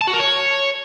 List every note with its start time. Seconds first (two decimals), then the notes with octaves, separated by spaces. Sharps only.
0.01 A5
0.07 F#4
0.13 A#4
0.19 C#5